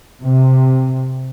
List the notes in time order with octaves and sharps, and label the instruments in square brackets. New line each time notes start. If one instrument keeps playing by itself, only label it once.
[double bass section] C3